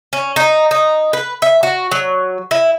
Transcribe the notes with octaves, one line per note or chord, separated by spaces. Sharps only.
C#4
D#4
D#4
B4
E5
F#4
F#3
E4